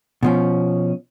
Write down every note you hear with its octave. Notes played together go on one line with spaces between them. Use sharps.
B2 F3 C#4